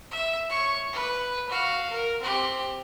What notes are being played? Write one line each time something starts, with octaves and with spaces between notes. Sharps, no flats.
E5
C#5 C#6
B4
F#4 F5
A#4
C4 G4